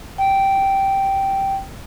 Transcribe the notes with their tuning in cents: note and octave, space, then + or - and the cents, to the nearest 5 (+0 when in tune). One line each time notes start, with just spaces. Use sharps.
G5 -10